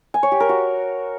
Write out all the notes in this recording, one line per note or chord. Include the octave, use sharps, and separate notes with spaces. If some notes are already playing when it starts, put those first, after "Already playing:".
G#5
C#5
G4
A#4
F#4